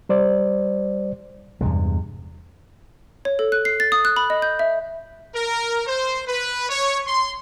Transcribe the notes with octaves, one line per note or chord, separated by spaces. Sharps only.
G3 C5 D5
E2 G2 C3 G#3
C#5
A4
F#6
C7
A6
D#6
F#6
B5
D#5
G6
E5
A#4
C5
B4
C#5
C6